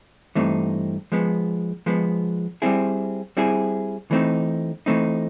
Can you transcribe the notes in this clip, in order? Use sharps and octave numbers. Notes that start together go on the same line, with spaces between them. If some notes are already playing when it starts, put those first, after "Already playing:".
G2 E3 A3 C4 D#4
F3 G#3 B3
F3 G#3 B3
G3 C4 E4 G#4
G3 C4 E4 G#4
E3 A3 C4 D#4
E3 A3 C4 D#4